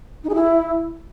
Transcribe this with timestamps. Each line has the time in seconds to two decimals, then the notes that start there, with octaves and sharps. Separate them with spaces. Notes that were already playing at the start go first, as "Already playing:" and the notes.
0.24 D#4
0.29 G#4
0.35 E4